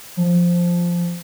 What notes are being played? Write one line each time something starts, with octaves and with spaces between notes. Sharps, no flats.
F3